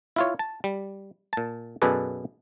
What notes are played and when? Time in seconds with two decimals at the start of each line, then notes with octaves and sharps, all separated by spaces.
0.16 E4 F4 C#5
0.39 A5
0.64 G3
1.33 A#2 A5
1.82 F#2 B2 G#4 A4 B4 D5